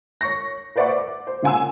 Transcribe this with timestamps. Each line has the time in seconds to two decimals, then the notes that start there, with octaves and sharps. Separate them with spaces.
0.21 C#5 C#6 A#6
0.76 B4 C5 D5 E5 F#5 C#6
0.98 D6
1.27 C5
1.43 C#3 F4 F#5 G#5 C6 E6